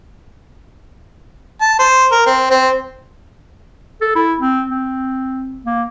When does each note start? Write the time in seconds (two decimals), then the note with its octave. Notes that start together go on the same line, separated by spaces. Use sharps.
1.61 A5
1.79 C5
2.12 A#4
2.26 C4
2.51 C4
4.01 A4
4.16 E4
4.40 C4
4.70 C4
5.65 A#3